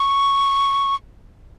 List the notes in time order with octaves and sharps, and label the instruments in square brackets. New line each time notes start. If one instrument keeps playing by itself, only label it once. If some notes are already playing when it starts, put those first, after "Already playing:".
Already playing: [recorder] C#6